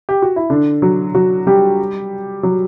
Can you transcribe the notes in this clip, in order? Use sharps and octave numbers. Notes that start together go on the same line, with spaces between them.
G4
F#4
E4
D3 D4
F#3 F#4
F#3 F#4
G3 G4
F#3 F#4